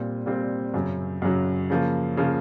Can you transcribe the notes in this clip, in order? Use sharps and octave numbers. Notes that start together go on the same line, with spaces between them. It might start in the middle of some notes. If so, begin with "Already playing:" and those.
Already playing: A#2 G3 C4
A#2 G3 C4
F#2 C#3 F#3
F#2 C#3 F#3
C#3 F3 A#3
C#3 F3 A#3